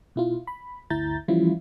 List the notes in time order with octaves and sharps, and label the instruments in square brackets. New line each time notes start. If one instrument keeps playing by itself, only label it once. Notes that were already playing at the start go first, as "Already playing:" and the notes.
[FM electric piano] B2 E4 F4
B5
G1 D2 E4 A#5 G6 A6
E3 F3 G3 C#4 E4 F4